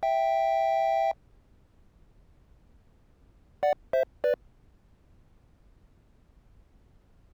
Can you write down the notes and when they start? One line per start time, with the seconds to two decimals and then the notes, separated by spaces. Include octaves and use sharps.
0.03 E5 G5
3.63 D5 F#5
3.93 C5 E5
4.24 B4 D5